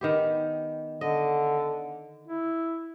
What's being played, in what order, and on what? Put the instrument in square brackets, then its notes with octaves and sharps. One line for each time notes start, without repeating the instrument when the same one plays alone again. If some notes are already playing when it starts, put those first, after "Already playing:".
[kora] D#3 B3 G4
[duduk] D3 [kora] D#5
[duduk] E4